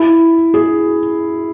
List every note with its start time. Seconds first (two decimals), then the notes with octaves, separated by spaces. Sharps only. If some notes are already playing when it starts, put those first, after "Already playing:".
Already playing: E4
0.54 G#4